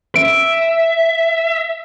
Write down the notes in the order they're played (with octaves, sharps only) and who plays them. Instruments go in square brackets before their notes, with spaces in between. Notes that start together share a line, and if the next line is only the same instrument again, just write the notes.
[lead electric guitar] E5 [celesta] D7